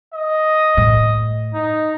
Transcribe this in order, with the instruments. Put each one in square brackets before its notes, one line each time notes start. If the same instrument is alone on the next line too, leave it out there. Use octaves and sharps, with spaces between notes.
[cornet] D#5
[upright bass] A2
[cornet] D#4